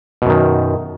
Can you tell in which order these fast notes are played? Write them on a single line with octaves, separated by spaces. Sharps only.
B2 F#2 D#3